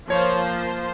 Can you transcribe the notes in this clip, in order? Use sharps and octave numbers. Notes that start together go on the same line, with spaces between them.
F3 A#3 F4 C5 C#5